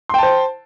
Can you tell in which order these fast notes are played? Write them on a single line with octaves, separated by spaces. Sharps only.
C6 G5 A5 C5